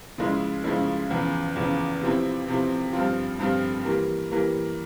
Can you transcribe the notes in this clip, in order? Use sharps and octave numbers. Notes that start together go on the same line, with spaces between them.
C#3 F3 G#3 E4
C#3 F3 G#3 E4
E2 C#3 F3
E2 C#3 F3
C3 F3 C4 E4
C3 F3 C4 E4
G2 F3 C4 F4
G2 F3 C4 F4
E3 G3 A#3
E3 G3 A#3